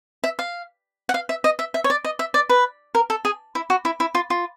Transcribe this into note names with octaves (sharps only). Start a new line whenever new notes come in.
E5
F5
F#5
F5
E5
D#5
E5
E5
C#5
D5
D#5
E5
D5
B4
A#4
A4
G#4
E4
F#4
E4
E4
F4
F4